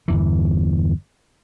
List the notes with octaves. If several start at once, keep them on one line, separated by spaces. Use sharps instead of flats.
G1 E2 E3